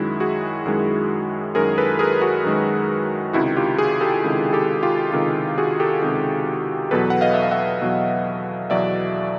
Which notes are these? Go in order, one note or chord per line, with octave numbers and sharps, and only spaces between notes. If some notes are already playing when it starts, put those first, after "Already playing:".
Already playing: F#2 D#3 G#3 E4 F#4
F#4 G#4
F#2 D#3 G#3
F#2 D#3 G#3 G#4 A#4
A4 B4
G#4 A#4
F#4 G#4
F#2 D#3 G#3
C#2 C3 D#3 E4 F#4
F4 G4
F#4 G#4
G4 A4
C#2 C3 D#3
G4 A4
F4 G4
C#2 C3 D#3 F4
F#4 G#4
G4 A4
C#2 C3 D#3
E2 B2 F#3 A4 B4
F#5
D#5 F5
E5
F5
E5 F#5
E2 B2 F#3
E2 B2 F#3 D5 E5